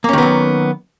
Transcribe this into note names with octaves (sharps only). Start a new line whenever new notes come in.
D#3 F#3 A#3 B3 C#4